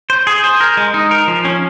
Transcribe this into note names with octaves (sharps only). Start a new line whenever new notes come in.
C5
G#4
C5
A#4
G#3
D#4
A#4
F3
C#4